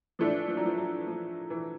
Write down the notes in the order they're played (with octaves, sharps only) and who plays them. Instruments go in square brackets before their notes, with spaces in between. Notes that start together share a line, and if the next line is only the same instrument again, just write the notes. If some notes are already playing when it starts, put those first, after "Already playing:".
[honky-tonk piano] E3 A3 D4 [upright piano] F3
[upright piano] F3
F#3
F3
F#3
F3
E3